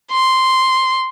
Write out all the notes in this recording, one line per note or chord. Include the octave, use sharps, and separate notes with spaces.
C6